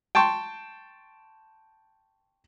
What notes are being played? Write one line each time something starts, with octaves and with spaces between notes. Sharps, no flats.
G5 A5 C6 C#6